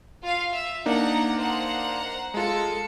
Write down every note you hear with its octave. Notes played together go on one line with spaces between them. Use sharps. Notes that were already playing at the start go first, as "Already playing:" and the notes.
F4 F5
E5
A#3 D4 D#4 F#5 A#5
C5 F#5 A#5
G#3 F4 A4 C#7